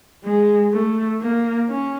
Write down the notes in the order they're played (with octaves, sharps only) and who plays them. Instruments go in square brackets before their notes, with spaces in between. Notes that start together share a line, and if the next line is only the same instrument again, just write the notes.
[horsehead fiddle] G#3
A3
A#3
C#4